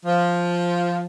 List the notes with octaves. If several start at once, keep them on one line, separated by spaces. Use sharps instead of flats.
F3